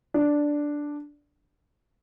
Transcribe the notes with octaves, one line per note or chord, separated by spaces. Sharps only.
D4